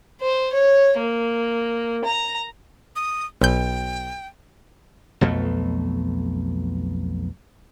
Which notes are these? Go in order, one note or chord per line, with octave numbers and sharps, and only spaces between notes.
C5
C#5
A#3
A#5
D#6
B1 G5 G6
B1 F2 B2 A3